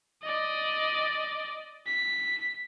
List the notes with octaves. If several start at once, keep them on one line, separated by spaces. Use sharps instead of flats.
D5 D#5
B6